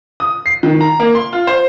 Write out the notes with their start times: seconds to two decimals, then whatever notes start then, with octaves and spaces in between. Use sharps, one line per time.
0.20 D#6
0.46 C7
0.63 D#3
0.81 A#5
1.00 A#3
1.15 C6
1.33 F4
1.47 C5